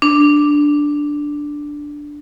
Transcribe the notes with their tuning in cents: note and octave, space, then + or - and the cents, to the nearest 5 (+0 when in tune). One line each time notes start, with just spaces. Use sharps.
D4 +0